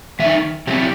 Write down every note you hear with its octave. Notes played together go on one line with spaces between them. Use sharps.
D#3 A3 D#4 E5
C3 F#3 C4 E4 G4